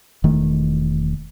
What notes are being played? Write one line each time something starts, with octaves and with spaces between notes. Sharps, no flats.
E1 D#3 A3